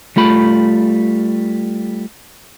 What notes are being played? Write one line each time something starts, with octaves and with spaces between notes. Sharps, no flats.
G3 A3 F4 B5